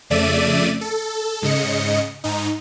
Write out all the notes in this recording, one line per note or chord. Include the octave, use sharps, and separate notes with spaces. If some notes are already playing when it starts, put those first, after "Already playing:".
F2 C#3 A3 D5 E5 D#7
A4
G#2 C#3 D#5 C#7
G#2 D#4